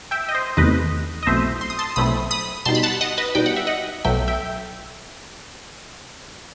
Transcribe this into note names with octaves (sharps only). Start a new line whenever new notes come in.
E5 G5
D#5
C5
E2 C3 D#3 A3 D#4 B4 D#5
D#5
B1 B2 A3 C4 E4 C5 E5
C6
D#6
A5 C6
B1 B2 A3 C4 E4 B5 D#6
B5 D#6
B2 G3 D#4 A5 C6
B5
F#5 A5
D#5 F#5
B4 D#5
B2 G3 D#4 G5
F#5
E5
D#5 F#5
B1 B2 F#3 A3 E5 G5
E5 G5